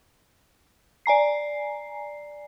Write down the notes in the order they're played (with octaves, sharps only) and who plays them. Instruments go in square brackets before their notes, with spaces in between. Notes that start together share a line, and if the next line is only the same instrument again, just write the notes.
[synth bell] D5 G#5 A#5 C7